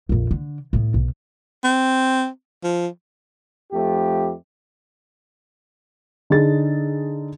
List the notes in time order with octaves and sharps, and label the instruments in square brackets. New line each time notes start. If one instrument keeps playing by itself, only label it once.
[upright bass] A#1 F2
D3
A2 B3
B1
[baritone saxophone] C4
F3
[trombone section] F2 A3 G4
[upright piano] D3 D#4 G#4 A6